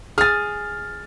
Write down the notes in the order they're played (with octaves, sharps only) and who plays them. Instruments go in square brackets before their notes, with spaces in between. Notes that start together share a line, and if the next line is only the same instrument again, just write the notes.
[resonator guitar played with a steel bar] G#4 G#5 [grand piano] F6 A6